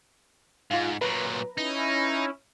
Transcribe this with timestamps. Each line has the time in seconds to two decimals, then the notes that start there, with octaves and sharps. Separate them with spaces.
0.71 G#2 F4 F5
1.01 A#2 F#3 B4 A#5
1.58 C#4 D#4 E4